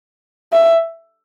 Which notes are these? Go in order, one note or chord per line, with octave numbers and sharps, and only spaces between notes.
E5